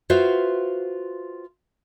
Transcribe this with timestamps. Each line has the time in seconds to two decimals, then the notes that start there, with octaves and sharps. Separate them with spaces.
0.10 F4 F#4 B4 C5 E5 F5